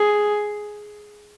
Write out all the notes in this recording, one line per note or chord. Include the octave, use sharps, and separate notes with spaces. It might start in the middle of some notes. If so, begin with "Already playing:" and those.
Already playing: G#4